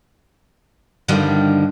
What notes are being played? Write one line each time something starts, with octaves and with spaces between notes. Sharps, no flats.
G2 D3 D#3 F3 G3